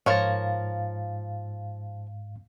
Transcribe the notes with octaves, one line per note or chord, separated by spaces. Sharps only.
G#2 F3 A#4 C#5 F5 A6